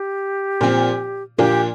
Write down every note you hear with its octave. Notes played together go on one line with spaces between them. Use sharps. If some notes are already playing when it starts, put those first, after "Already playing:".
Already playing: G4
A#2 F3 C4
A#2 F3 A#3 D4 G4